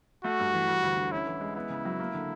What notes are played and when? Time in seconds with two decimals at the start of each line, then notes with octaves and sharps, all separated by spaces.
0.24 A3 F#4
0.39 G2
0.54 E3
0.68 G3
0.83 D2
0.97 D3
1.11 C#4 E4
1.27 E3
1.41 G#3
1.56 B3 E4
1.70 C#3
1.85 F#3
2.00 A#3
2.14 D3